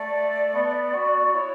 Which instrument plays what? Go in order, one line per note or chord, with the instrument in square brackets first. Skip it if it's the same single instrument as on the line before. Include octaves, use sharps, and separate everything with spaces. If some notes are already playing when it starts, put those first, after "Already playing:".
Already playing: [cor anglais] A3 [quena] D5
[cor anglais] B3
F#4
F#4
[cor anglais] E4 [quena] C#5